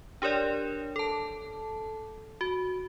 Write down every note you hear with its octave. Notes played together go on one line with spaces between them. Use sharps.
D4 G4 A#4 C#5 D5
A4 A5
F#4